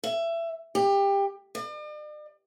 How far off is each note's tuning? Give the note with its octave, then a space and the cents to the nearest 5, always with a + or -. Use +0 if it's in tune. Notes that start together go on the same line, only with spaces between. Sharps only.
E5 +20
G4 +20
D5 +45